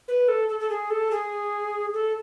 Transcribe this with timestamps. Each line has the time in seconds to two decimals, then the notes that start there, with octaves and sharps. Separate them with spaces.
0.08 B4
0.28 A4
0.49 A4
0.60 A4
0.70 G#4
0.90 A4
1.11 G#4
1.94 A4